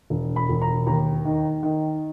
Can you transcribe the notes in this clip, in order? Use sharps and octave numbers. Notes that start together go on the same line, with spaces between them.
E1
B5
E1
A#5
D#2 A#5
D#3
D#3